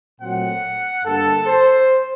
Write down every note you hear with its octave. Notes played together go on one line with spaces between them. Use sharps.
A#2 F#3 A3 C4 F#5
G2 D3 G3 A#3 A4
C5